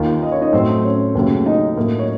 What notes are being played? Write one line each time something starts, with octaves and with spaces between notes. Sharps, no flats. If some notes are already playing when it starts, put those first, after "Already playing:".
Already playing: D#2 D#3 A#3 F4 F5
D#5
C#5
D#4 D#5
A2 F#3 A3 C4 C5
C#4 C#5
D#2 C#3 F#3 A3
D#4 D#5
A2 F#3 A#3
C#5